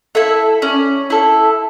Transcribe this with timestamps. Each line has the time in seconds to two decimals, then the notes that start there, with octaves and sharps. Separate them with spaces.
0.15 E4 A4 E5
0.62 C#4 D5
1.10 E4 A4